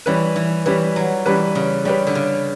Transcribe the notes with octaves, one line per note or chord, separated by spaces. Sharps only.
E3 G3 C#4 G4 B4
E3
E3 G3 C#4 G4 B4
F#3
E3 G3 C#4 G4 B4
C#3
C#3 G3 C#4 G4 B4
D3
C#3